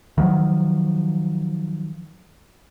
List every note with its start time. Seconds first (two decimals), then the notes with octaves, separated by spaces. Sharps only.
0.18 D#3 F3 F#3